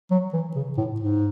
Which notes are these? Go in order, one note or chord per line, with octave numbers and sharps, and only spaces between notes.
F#3
E3
C#3
A2
G#2